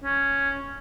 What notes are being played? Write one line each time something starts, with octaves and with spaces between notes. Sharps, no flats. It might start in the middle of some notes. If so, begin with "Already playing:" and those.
C#4